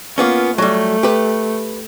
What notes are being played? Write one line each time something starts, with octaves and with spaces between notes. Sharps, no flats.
A#3 B3 C#4 F4
F#3 G3 A3
G4 B4